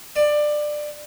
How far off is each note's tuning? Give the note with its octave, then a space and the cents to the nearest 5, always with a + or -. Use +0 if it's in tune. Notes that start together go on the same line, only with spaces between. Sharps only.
D5 +20